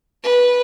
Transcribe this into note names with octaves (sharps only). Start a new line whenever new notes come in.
B4